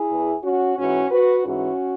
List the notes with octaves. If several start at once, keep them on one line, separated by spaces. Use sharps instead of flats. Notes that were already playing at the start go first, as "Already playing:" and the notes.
Already playing: E4 G#4
E2 E3
C#4 F#4
G#2 E3 C#4 F#4
F#4 B4
G#2 E3 C#4 F#4